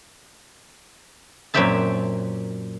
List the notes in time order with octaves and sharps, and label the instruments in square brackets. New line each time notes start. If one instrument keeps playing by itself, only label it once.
[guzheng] F#2 A#2 C4 G4 E5 A5